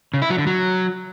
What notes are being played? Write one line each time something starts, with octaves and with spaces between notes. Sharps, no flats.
C#3
E4
F#3
D3
F#3